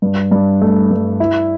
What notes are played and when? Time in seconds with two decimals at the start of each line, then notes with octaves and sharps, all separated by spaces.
0.02 G2
0.31 G2
0.62 A3
0.91 G2
1.20 E4